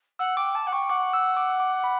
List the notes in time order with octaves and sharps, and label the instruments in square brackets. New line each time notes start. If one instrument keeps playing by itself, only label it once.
[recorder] F#5 [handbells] E6
[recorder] G5 [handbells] D6
[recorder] A5 [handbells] D6
[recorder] F#5
[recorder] G5 [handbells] C#6
[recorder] F#5 [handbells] D6
[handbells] E6
D6
D6
B5